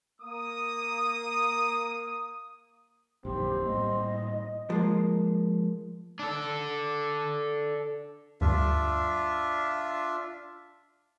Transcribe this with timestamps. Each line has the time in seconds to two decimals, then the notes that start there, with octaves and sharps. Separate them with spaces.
0.20 A#3 D#6
3.25 A#1 F#2 D#3 C4 G4
3.66 A2 G3 A#3 D#5
4.70 F3 G#3 A#3
6.19 D4 A4
8.41 D2 G2 D4 F4 E5